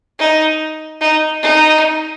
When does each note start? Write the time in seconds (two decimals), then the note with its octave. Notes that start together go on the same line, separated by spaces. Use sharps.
0.19 D#4
1.01 D#4
1.42 D#4